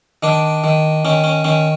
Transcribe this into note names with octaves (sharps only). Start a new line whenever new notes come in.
D#3 D4
D#3
D#3 C#4
C#4
D#3 C#4